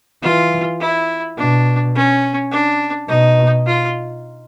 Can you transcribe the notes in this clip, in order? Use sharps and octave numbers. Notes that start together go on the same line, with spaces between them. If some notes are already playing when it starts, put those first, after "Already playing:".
E3 F4
E4
B2 D4
C#4
D4
B2 D#4
F4